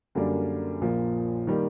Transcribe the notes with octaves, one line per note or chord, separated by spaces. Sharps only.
F#2 D3 G3 A#3 D4
A#1 A#2 F3 A#3
D#3 G3 A#3